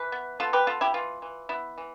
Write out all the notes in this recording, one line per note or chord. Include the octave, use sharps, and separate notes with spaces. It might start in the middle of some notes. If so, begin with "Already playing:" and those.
Already playing: E3 B4
B3
B3 F4 A4
G4 B4
B3 F4 A4
E4 G4
E3 F4
E3
B3 E4
E3